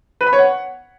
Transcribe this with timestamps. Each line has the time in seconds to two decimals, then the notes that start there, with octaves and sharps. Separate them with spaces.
0.21 B4
0.27 B5
0.33 C#5
0.39 F#5